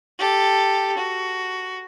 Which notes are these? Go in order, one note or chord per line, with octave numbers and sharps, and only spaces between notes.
G4 A4
F#4